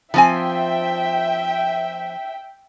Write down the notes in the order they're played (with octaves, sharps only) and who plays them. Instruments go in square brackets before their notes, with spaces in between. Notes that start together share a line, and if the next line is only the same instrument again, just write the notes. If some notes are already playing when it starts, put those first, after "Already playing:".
[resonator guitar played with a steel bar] F3 C4 G#5 [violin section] E5 G5